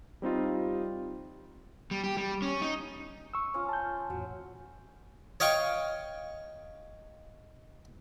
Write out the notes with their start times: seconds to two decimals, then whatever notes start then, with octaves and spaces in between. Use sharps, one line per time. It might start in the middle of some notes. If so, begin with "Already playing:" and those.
0.22 G3 C4 D#4 F4
1.91 G3
2.03 G4
2.17 G3
2.42 C#4
2.62 D#4
3.34 C#6 E6
3.54 C#4 F4
3.69 A5 G6
4.10 E2 A2 F#3
5.40 C#5 D#5 F5 G5 C#6